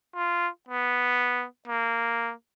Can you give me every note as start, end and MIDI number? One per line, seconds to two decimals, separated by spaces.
0.15 0.49 65
0.69 1.46 59
1.68 2.33 58